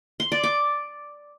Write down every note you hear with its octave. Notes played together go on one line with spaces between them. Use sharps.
C6
D5
D6